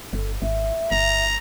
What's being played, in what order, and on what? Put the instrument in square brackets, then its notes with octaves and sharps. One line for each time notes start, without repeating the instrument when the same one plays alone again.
[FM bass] G1 [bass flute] A4
[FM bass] G#1 [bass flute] E5
[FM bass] G1 [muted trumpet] A#5